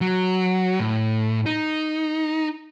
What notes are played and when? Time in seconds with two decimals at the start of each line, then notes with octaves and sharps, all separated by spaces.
0.01 F#3
0.80 A2
1.46 D#4